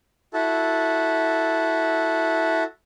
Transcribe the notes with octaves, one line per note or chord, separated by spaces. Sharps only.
E4 F#4 A4